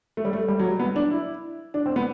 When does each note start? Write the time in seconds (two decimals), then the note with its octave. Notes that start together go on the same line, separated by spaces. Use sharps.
0.17 A3
0.25 G3
0.33 A3
0.48 G3
0.59 F#3
0.69 G3
0.80 B3
0.96 D4
1.11 E4
1.74 D4
1.86 C4
1.96 B3